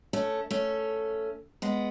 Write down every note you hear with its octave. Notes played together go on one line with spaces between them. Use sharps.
A3 C#4
A3 C#4
G#3 B3